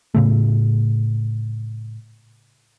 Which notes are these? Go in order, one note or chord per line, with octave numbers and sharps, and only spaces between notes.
A2 C#3 A3